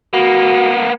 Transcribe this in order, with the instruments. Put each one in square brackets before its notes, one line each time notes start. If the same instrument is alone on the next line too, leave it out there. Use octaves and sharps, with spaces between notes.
[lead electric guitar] A#3 B3 [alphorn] F#4